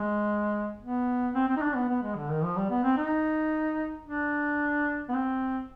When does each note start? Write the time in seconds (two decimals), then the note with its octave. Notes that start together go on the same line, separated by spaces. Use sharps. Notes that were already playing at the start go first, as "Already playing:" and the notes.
Already playing: G#3
0.81 B3
1.35 C4
1.48 C4
1.56 D#4
1.62 D4
1.75 B3
1.89 B3
2.03 G#3
2.16 D3
2.29 D#3
2.43 F3
2.57 G3
2.70 B3
2.84 C4
2.97 D#4
4.06 D4
5.09 B3
5.14 C4